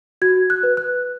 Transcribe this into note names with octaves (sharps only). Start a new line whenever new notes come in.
F#4 G#6
F#6
B4
F#6